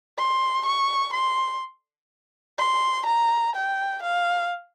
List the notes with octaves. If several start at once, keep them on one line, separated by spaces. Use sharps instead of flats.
C6
C#6
C6
C6
A#5
G5
F5